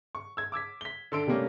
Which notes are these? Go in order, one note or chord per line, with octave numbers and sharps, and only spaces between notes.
C#6
E6 G#6
D6 E6 G#6 B6
B6 G7
D3 A4 C6 E6 D7
C3 G3 A3 A#3 C#4 D4